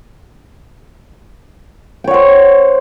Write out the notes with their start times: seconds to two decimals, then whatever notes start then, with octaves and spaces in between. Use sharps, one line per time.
2.04 G5
2.07 C#5
2.11 F#5
2.14 C5